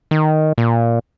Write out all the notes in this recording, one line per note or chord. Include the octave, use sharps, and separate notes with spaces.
D#3
A#2